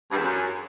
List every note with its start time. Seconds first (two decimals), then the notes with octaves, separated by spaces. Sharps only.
0.11 G2
0.16 E2
0.21 F#2